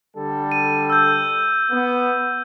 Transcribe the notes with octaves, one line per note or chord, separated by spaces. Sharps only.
D3 G3 A4
D#7
E6 G6
B3